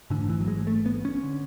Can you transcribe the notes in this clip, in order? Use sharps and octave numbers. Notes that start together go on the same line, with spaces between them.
A1 G#2 D3
E3
F#3
G#3
A3
B3
C#4
D3